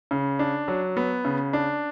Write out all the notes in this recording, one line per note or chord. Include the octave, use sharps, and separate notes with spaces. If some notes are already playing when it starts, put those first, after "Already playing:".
C#3
D4
F#3
B3
C#3
D4